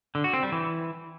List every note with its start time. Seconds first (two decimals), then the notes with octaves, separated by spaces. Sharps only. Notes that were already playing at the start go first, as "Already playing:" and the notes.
0.15 D3
0.24 F#4
0.33 C4
0.43 G3
0.52 E3